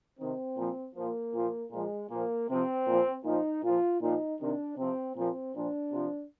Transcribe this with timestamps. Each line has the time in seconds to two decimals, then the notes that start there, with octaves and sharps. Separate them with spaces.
0.19 C3 D#3 C4
0.56 A#2 F3
0.95 A#2 F3 A#3
1.33 A#2 F3
1.71 A#2 F3 G#3
2.09 A#2 F3 A#3
2.48 C3 F3 C4
2.87 A#2 F3
3.24 A#2 F3 D#4
3.63 A#2 F3 F4
4.01 A#2 F3 D#4
4.39 C3 D#3 D4
4.77 C3 F3 C4
5.15 A#2 F3 C4
5.54 A#2 F3 D4
5.92 C3 F3